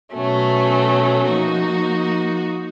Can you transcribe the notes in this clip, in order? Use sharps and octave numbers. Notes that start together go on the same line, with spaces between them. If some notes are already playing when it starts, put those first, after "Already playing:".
B2 F#3 A3 C#4
F3 A#3 D#4 F#4